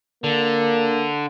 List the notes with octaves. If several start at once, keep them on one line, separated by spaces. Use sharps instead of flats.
D3 A#3